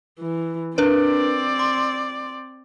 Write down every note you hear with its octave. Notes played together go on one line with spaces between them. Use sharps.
E3
C4 D4 A#4 B4 D5
C6